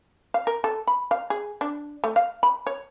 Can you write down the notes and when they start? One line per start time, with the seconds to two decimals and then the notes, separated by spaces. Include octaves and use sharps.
0.34 F5
0.47 A#4
0.64 A4
0.87 B5
1.11 F5
1.30 G#4
1.61 D4
2.04 A3
2.16 F5
2.43 B5
2.67 C#5